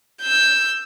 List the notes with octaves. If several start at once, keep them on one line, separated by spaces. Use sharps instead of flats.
E6 G6